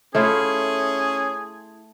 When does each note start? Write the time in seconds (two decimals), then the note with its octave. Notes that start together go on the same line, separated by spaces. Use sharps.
0.15 A3 C#4 E4 F4 G#4